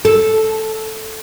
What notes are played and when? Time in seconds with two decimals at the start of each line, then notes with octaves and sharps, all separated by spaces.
0.05 A4